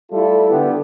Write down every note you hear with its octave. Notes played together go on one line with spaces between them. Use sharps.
G3 A3 E4 F4 A4
D3 B3 G4